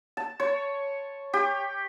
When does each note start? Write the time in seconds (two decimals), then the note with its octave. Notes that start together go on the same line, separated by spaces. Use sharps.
0.17 A5
0.40 C#5
1.33 G4